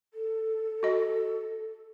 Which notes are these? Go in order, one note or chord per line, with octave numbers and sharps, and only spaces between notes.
A4
F#4 D#5